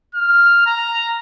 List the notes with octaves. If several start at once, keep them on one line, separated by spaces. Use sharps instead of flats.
F6
A#5